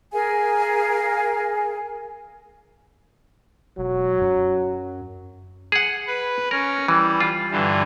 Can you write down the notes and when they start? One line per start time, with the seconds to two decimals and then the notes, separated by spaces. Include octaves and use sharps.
0.13 G#4 A#4 F5 G#5
3.78 E1 F#3
4.21 F#2
5.72 G#4 F#5
6.07 B4
6.51 C#4 A#4
6.88 E3 G3
7.21 F4
7.51 G2 D3 E3